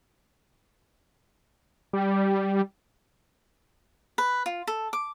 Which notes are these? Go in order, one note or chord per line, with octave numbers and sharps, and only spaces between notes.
G3
B4
F4
A4
D6